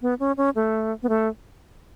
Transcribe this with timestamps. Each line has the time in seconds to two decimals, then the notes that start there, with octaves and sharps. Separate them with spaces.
0.02 B3
0.20 C#4
0.37 C#4
0.55 A3
1.03 B3
1.09 A3